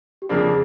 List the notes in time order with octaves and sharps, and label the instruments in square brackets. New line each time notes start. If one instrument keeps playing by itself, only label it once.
[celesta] G4
[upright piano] F2 C#3 F3 A#3 D4 [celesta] G#4
[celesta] G#4